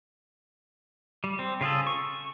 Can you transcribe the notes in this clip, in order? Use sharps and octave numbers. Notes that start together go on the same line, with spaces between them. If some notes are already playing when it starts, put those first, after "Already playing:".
G3
C4
C#3 F4 G#4 A4
C#6